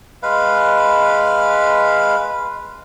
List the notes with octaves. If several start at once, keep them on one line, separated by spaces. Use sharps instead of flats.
G#3 B4 F5